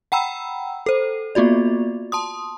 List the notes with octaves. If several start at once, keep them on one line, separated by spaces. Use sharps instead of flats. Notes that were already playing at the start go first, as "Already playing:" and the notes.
F#5 G5 A#5 B5 E6
A4 C5
A#3 B3 F4 F#4 D5
A5 C6 D#6